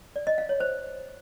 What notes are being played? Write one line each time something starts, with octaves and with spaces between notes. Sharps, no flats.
D5
D#5
F5
C#5
C5